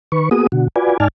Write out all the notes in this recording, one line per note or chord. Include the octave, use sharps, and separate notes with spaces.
D#3 B4 C#6
A#3 B3 F#4 G#4 D#6
B2 D3 F#4
F4 F#4 B4 D5 G#5
G#2 D#4 D5 G#5 A5 F6